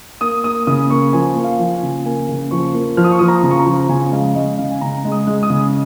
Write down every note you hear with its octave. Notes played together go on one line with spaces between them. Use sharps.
A#3 D#6
A#3 D#6
C#3 D#6
A#3 C#6
F3 G#5
A#3
F5
F3
G#5
C#3
A#3 G#5
C#3
F3 C#6
A#3
F3 F6
D#6
C#6
F3 D#6
A#5
C#3
C#6
A#5
F3
C#3 G#5
G#5
G#3 F5
G#3 D#5
C#3 F5
G#5
C#3 A#5
G#3
D#6
G#3
D#6
C#3